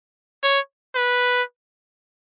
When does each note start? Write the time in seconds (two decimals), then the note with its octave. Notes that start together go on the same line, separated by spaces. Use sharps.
0.44 C#5
0.95 B4